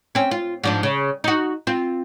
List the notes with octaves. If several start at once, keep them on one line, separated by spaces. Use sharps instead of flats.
C4 C#4
F4
G#2 F3 D4
C#3
D#4 F#4
C4 F4